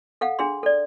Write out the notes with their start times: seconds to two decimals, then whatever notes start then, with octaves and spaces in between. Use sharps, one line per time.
0.21 A4 F5 F#5
0.39 D4 G#4 C6
0.63 A4 D5